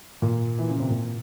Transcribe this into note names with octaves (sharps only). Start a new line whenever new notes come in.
A#2
E3
C#3
C3
A#2